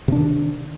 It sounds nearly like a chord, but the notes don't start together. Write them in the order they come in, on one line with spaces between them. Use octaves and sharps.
C3 D4 D#3